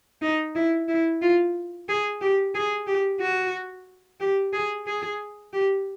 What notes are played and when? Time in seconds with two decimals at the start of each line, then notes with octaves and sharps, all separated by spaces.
0.22 D#4
0.55 E4
0.88 E4
1.22 F4
1.89 G#4
2.21 G4
2.55 G#4
2.87 G4
3.21 F#4
4.20 G4
4.53 G#4
4.87 G#4
5.53 G4